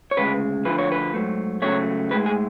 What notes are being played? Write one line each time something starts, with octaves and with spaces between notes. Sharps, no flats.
C#5
D2 C#3 G#3 B4
D2 D3 F3 B4
C#5
B4
G#2 F#3 A3
C#2 C#3 F#3 A3 C#5
A2 G#3 B4
G#4